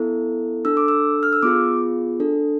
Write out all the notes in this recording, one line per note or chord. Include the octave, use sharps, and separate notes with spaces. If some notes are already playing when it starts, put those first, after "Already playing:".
Already playing: B3 E4 A4
D4 A4 E6
D6
E6
F6
E6
B3 F4 G#4 D6
D4 A4